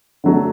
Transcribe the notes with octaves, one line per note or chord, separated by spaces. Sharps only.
D3 F#3 A3